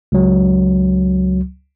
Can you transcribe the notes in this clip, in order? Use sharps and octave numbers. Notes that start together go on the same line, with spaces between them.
C#2 F#3